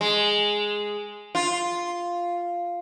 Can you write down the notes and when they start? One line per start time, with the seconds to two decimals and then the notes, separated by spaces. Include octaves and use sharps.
0.01 G#3
1.35 F4